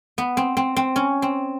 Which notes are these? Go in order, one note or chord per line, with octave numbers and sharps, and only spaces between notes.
B3
C4
C4
C4
C#4
C4